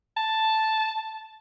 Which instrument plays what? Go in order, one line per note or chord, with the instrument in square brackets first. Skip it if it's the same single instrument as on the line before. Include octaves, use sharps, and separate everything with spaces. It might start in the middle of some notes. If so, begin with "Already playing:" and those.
[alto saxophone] A5